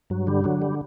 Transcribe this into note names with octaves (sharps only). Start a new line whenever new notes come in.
G2 F#3
D3 G3
D3 F#3
G3